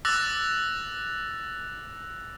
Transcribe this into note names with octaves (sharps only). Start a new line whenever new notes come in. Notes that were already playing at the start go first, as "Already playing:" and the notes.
D6 E6 F#6 A6 A#6 F7